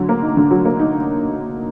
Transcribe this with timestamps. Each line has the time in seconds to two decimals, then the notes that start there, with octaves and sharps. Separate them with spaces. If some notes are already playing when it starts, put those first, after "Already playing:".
Already playing: D3 F#3
0.09 A#3
0.22 D#4
0.37 D3
0.51 F#3
0.65 A#3
0.79 D#4